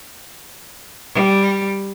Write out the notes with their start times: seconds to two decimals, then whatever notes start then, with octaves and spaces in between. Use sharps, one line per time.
1.14 G3